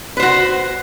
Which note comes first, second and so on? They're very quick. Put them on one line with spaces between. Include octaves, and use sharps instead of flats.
B4 C5 F#4